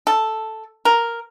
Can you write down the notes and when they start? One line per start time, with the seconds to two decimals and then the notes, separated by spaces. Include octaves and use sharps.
0.07 A4
0.85 A#4